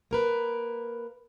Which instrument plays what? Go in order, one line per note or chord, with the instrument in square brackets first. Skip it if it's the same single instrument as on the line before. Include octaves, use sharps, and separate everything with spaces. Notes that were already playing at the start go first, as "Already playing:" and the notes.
[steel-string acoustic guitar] A#3 A#4 B4